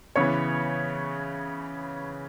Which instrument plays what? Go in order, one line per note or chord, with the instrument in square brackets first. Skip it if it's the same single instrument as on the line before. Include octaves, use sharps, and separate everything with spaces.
[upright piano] C#3 E3 B3 C#5 C#6